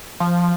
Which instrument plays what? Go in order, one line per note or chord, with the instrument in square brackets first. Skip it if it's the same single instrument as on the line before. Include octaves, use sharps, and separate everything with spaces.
[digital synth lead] F3